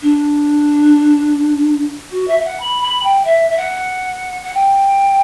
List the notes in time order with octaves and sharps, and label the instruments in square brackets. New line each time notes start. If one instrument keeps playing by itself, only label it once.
[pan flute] D4
F#4
E5
E5
F#5
B5
B5
G5
E5
E5
F#5
F#5
G5